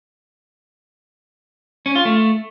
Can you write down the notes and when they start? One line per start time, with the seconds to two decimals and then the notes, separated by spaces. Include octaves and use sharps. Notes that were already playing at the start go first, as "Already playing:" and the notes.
1.86 C#4
1.95 F4
2.05 A3